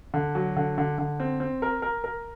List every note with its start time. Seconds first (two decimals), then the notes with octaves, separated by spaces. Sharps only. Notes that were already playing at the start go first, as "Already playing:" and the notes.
0.14 D3
0.35 F#3
0.56 D3
0.78 D3
0.98 D3
1.20 C4
1.40 C4
1.62 A#4
1.82 A#4
2.04 A#4